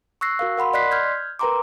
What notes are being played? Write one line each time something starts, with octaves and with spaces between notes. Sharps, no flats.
C#6 E6 F#6 A#6 C7
F#4 A#4 F5
A#4 F#5 B5 C6
D5 D#5 C6 F#6 B6 C7
F6 G6 G#6
A#4 B4 G5 A#5 C6 D6